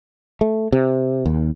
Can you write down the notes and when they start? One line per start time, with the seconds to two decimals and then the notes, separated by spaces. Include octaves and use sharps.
0.41 A3
0.72 C3
1.26 D#2